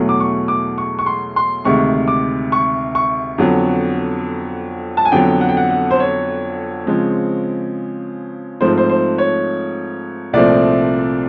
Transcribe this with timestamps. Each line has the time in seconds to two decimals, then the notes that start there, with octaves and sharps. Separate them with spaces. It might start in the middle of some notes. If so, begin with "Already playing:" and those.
Already playing: E2 B2 F#3 A3
0.09 D6
0.20 C#6
0.48 D6
0.78 C#6
0.99 C#6
1.06 C6
1.36 C6
1.64 D2 C3 D#3 G#3 C#6
2.08 D6
2.52 C#6
2.95 C#6
3.38 F2 D3 F#3 B3
4.97 A5
5.05 G#5
5.12 F2 D3 F#3 B3 G5
5.41 F#5
5.49 G5
5.57 F#5
5.71 F#5
5.91 C5
6.00 C#5
6.86 C#3 F3 G#3 C4
8.61 G#2 F3 A3 C4 C5
8.78 C5
8.89 C5
9.18 C#5
10.33 C2 A#2 F3 A3 C4 D5